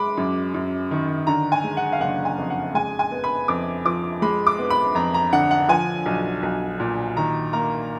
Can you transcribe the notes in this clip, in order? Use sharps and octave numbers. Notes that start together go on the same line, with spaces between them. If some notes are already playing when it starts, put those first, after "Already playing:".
Already playing: G#3 B5 D6
F#2
F#2
D#3
D3 A#5
G#5
G#3
F#5
F5
F#1 F#5
G#5
F2
F#5
G#3 G#5
G#5
B3
B5
F2 D6
F3 D6
G#3 B5
D6
B3
B5
F2 A#5
A#5
D3 F#5
F#5
F3 G#5
B1
B1
A#2
D#3 A#5
A#3 A#5